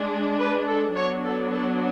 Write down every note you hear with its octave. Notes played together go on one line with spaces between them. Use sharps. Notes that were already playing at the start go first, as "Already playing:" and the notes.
Already playing: G#3 D4
B4
A4
F#3 B3 D4 C#5
A4
A4